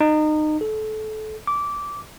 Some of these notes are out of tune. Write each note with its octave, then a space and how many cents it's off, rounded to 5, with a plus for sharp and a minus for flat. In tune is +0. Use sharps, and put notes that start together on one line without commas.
D#4 -25
A4 -25
D6 -15